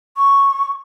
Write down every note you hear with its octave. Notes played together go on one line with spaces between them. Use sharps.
C#6